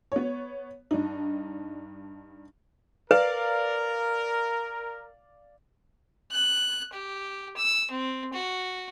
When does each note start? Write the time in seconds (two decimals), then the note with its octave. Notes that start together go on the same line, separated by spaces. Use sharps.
0.12 B3 C#5
0.91 G2 D4 D#4
3.11 A#4 B4 D5 F5
6.32 F#6
6.93 G4
7.57 E6
7.91 C4
8.33 F#4